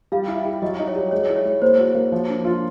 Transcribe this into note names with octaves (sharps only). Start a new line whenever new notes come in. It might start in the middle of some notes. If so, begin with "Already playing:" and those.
G3 F5
E4
E5
G4
F#3 D#5
D#4 D#5
C#5
G4 D5
G#3 C#5
E4
C#5
G#3
A#3 C5
F#4
A#3
F3
D4
F4